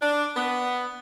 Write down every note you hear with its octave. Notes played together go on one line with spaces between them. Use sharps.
D4
B3